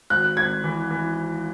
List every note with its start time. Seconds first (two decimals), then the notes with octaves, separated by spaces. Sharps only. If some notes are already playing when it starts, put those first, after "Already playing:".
0.10 G#1 F#6
0.37 G#1 G#6
0.64 E3
0.91 E3